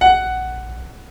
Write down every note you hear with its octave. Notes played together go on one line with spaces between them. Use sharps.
A#1 F#5